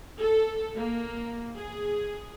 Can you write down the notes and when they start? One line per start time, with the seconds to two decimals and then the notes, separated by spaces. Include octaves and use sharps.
0.20 A4
0.76 A#3
1.55 G#4